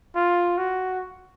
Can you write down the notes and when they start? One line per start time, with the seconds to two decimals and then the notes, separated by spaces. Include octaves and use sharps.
0.15 F4
0.58 F#4